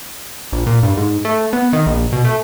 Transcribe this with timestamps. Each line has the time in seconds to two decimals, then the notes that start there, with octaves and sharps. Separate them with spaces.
0.52 A#1
0.66 A#2
0.83 G2
0.97 G#2
1.25 A3
1.53 B3
1.73 D#3
1.86 A#1
2.13 B2
2.25 A3